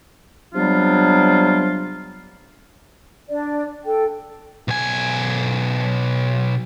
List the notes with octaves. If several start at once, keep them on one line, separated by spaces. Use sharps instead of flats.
C3 F#3 G3 B3 D4 F4
D4 D5
A4 G5
B1 G#5